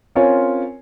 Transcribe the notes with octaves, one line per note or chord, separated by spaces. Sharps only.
C4 C#4 F4 A#4 C#5 G#5